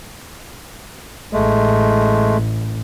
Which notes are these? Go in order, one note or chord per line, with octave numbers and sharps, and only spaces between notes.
A1 G#3 A3